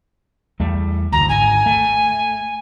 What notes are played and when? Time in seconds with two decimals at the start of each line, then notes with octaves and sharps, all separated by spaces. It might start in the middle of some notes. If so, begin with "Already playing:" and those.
0.60 E2 G3 A3
1.12 F#1 D2 A#5
1.29 G#1 G#5
1.66 A3